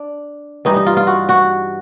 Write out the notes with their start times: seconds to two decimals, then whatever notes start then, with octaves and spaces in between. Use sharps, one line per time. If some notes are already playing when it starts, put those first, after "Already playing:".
Already playing: D4
0.65 G2 E3 G3 D#4
0.76 D#4
0.86 F4
0.97 F4
1.07 F#4
1.29 F#4